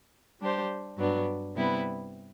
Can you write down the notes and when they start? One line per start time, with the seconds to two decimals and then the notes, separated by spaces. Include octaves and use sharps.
0.39 G3 D4 G4 C5
0.97 G2 F#3 B3 D4
1.55 C3 G3 B3 E4 B4